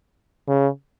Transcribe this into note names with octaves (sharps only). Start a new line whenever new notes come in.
C#3